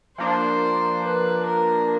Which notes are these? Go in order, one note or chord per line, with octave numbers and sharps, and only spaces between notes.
F3 A#3 D4 C5
B4
A#4